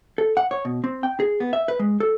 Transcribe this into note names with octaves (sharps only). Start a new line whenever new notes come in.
A4
F#5
C#5
B2
C4
G5
G#4
B3
E5
B4
G#3
A4